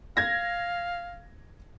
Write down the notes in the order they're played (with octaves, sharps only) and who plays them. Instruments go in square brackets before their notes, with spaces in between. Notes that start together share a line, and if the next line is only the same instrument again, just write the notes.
[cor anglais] F5 [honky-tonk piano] G#6 A#6